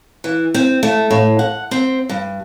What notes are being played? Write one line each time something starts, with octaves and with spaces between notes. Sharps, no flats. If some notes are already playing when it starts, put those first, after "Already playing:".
E3
C4
A3
A2
F#5
C4
G2